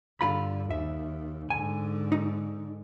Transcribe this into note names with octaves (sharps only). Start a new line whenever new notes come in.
G2 D3 F4 B5
D#2 E5
G#2 D3 G#5
D#4